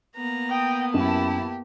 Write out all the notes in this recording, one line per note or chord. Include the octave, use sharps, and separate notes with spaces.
A#3 B3 A#5
G5 D#6
F#2 E4 G4 A5